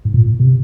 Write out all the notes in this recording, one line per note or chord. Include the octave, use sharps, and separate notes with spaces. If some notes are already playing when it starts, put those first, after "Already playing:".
G#2
A#2
C3